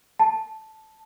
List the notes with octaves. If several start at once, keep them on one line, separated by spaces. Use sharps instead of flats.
A5